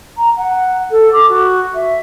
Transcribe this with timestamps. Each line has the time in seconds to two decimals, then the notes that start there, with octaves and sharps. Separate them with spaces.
0.17 A#5
0.36 F#5
0.91 A4
1.12 D6
1.28 F#4
1.74 E5